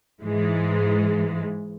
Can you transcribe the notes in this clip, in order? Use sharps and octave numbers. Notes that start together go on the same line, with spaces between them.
G#2 E3 G#3